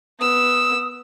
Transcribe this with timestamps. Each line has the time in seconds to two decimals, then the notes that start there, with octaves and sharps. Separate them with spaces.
0.19 B3 D#6 E6